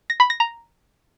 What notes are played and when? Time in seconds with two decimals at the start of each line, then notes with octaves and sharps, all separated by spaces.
0.10 A#6
0.20 B5
0.30 A#6
0.40 A#5